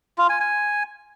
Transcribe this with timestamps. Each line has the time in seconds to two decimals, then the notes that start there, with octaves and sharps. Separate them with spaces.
0.18 F4
0.29 G#5
0.40 G#5